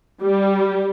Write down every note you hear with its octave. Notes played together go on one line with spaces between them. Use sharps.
G3